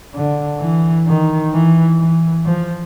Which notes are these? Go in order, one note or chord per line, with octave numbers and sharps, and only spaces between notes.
D3
E3
D#3
E3
E3
F3